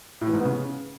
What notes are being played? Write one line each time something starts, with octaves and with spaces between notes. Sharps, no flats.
A2
E3
G#2
B3
C#3